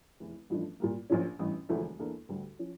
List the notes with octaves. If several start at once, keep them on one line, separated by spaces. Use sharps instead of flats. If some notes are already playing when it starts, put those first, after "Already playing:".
F1 E2 E3
A1 G2 F3 A3 D4
A#2 G3 A#3
A#1 A#2 F3 C#4
A1 G2 E3
E1 D2 D3 F3 A3
E2 E3 A#3 D4 A4
D2 D3 G3 D4 G4
F3 C#4